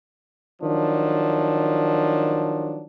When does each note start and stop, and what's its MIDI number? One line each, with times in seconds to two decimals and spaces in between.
0.62 2.84 51
0.62 2.84 53
0.62 2.84 54
0.62 2.84 62